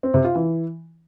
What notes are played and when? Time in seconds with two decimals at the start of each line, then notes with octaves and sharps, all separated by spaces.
0.03 C4
0.14 C3
0.24 F4
0.35 E3